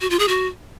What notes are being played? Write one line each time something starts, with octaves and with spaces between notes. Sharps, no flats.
F#4
F4
G#4
F#4